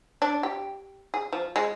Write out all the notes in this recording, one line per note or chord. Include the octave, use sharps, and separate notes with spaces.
D4
G4
G#4
F3
G#3